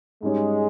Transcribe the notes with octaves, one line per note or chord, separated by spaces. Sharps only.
G#2 G3 G#3 C#4